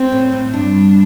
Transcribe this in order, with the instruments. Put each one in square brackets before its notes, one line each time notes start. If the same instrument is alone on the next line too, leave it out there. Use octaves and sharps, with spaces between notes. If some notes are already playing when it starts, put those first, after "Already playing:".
Already playing: [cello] C4
[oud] A2
A2
[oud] G2 [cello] D4